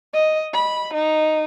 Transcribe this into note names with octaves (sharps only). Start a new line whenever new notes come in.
D#5
B5
D#4